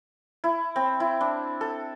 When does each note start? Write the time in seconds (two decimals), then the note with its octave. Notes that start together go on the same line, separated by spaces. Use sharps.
0.44 E4
0.76 C4
1.00 E4
1.21 D4
1.61 A4